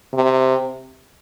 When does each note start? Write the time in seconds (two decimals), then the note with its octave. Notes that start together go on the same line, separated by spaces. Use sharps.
0.14 C3